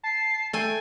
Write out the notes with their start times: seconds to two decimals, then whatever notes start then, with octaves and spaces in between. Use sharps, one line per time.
0.03 A5 C7
0.53 A3 A4 G5 G#5